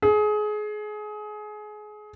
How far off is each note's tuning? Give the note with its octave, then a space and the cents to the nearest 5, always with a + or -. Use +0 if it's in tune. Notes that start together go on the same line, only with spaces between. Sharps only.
G#4 +25